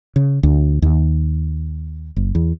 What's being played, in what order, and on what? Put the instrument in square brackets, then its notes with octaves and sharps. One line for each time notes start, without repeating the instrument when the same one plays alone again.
[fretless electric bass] C#3
D2
D#2
F#1
E2